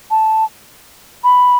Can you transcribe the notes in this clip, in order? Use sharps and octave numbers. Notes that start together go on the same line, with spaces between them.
A5
B5